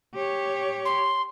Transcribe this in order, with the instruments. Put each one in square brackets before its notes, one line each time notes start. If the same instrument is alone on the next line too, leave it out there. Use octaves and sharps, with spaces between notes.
[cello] G4 C#5
[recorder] C6